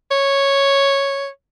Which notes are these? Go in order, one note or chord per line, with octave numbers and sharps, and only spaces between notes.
C#5